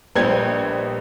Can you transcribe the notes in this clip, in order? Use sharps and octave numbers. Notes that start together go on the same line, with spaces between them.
A#1 G3 B3 C5 D#5 G#6